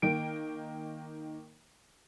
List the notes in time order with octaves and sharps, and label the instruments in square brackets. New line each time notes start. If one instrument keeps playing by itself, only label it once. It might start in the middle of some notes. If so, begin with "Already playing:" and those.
[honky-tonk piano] D#3 A#3 G5 D7